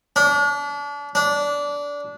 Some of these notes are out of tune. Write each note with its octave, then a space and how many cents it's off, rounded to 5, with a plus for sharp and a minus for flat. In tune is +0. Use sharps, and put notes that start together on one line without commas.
D4 -35
D4 -20